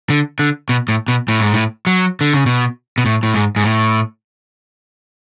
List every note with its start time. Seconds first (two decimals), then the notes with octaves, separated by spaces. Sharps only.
0.10 D3
0.39 D3
0.69 B2
0.89 A2
1.08 B2
1.28 A2
1.40 G#2
1.52 A2
1.87 F#3
2.21 D3
2.34 C#3
2.46 B2
2.98 B2
3.06 A2
3.23 A2
3.34 G#2
3.56 G#2
3.64 A2